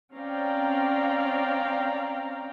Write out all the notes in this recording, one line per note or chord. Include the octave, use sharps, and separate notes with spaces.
C4 C#4 D5 F5 G5 A#5